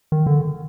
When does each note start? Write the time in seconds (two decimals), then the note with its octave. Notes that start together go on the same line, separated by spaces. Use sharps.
0.12 D#3
0.27 D3